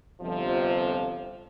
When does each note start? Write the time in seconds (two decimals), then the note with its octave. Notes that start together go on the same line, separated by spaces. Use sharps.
0.21 G1 F2 C3 F3